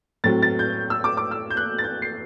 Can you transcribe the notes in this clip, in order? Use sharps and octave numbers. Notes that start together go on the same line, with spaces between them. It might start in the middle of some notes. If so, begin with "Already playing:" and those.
A2 F#3 C4 A6
A6
G6
E6
D6
D6
E6
G6
F#6
A6
G6
C7